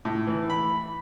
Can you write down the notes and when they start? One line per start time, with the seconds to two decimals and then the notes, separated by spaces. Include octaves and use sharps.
0.05 A2
0.27 E3
0.50 B5